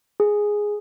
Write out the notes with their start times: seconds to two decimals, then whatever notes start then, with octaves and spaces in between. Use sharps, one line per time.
0.20 G#4